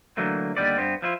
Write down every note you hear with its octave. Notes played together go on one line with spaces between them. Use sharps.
D3 E3 F#3 A3 A#3
D#2 G#2 D3 G3 B3 D5
G2 B3 C4
F3 E4 F4